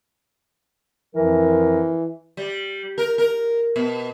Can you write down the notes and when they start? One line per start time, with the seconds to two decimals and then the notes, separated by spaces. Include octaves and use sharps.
1.16 F2 E3 F3 A#4
2.37 G3
2.98 A#4
3.18 A#4
3.76 B2